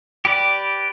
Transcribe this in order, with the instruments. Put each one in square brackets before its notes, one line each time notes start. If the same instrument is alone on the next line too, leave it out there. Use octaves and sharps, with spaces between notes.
[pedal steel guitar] G4 B4 D5